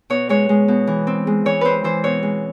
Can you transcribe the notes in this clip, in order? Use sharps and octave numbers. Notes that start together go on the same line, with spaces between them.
B2 C#5
G#3 C#5
G#3
B2
E3
C4
G#3
E3 C#5
C4 B4 C5
E3 C5
B2 C#5
G#3